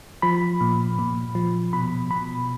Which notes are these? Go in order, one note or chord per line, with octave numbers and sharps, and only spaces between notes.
F3 B5
A#2
A#2
F3
B2 B5
B2 B5